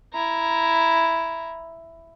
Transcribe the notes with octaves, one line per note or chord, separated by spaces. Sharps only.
E4 A#5